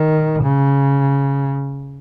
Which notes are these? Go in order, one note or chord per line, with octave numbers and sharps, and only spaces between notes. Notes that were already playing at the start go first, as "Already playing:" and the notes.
Already playing: D#3
C#3